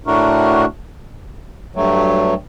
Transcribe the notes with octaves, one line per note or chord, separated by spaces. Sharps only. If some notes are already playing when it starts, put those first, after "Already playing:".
A2 A3 D4 F#4 A#4
G2 F#3 A3